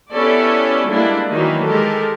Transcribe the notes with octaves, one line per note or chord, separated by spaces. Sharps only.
B3 C#4 E4 G4 A4 D5
G3 G#3 A#3 D4 E4
D#3 E3 F#3 A#3 D#4
G#3 G4 A4 A#4